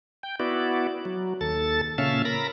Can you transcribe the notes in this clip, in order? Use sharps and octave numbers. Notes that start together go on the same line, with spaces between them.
G5
B3 E4 F#4 D5
F#3
D#2 A4 A6
A#2 C#3 C#4 E5 F5 A5
A#4 B5 A#6